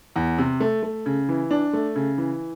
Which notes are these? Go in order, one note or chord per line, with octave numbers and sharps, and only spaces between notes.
E2
C3
A3
A3
C#3
E3
D4
A3
C#3
E3